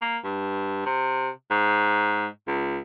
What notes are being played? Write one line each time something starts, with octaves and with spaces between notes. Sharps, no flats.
A#3
G2
C3
G#2
C#2